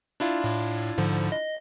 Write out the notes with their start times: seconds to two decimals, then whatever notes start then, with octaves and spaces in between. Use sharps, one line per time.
0.20 D4 E4 F4
0.44 A2
0.98 G#2 D3 F3
1.32 D#5